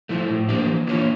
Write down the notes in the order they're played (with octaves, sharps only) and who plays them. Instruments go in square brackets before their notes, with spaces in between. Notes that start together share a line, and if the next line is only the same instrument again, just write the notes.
[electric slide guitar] F3 A3 E4
A2
F3 A#3 D4 G4
E3
A#3 D4 F4 C#5